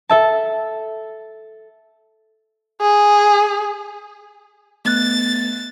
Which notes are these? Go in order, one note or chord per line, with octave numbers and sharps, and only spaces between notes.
A4 E5 A5
G#4
A3 B3 F#6 A6